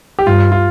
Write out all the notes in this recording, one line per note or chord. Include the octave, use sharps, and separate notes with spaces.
G4
G2 F4
F4